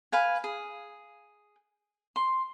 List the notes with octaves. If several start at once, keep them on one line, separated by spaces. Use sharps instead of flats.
B4 F5 G#5
G#4
C6